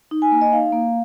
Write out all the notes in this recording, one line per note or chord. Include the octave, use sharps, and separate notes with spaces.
D#4
G#5
A#3
D#5
D#4 F5
A#3